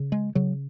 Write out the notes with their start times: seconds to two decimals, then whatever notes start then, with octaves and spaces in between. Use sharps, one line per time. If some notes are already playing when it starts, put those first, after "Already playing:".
Already playing: C#3
0.12 G#3
0.35 C#3 F#3